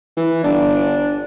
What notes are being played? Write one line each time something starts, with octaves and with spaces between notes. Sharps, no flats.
E3
G1 D4